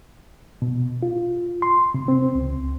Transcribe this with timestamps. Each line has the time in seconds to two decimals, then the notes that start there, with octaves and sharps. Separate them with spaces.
0.62 B2
1.03 F4
1.62 C6
1.94 C3
2.08 C4
2.35 C#2